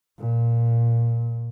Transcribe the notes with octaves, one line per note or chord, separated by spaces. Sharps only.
A#2